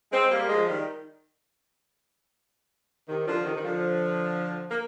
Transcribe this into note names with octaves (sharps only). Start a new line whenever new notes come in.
G#3 C4
G3 A#3
F3 G#3
D#3 G3
C3 D#3
D3 F3
C3 D#3
D#3
D3 F3
A#3